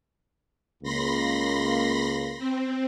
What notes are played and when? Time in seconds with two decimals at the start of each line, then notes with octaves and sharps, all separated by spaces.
0.83 C#2 A#3 B5 C6 A#6
2.38 C4